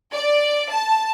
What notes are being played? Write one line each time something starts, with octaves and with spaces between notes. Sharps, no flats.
D5
A5